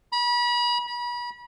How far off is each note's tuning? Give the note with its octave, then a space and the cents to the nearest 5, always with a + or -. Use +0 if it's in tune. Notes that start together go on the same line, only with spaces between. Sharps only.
B5 -35
B5 -35